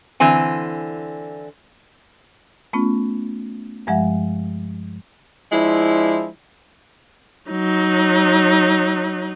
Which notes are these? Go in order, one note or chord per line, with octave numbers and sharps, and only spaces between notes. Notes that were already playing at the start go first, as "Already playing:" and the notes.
D3 E3 C4 G#5
A3 B3 C#4 F4
G2 F3 G#3 E5 F#5
F3 G#3 D4 E4
F#3 D#4